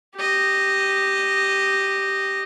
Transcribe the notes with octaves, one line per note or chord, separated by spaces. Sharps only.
G4 D#5